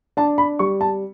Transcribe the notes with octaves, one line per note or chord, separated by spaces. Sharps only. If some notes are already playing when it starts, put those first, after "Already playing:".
D4 A5
B5
G3 C#6
A5